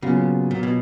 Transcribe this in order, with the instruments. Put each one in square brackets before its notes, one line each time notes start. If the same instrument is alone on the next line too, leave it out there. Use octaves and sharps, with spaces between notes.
[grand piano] A#2 F#3 B3 F4 [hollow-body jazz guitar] C#3
[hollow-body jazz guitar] A#2
B2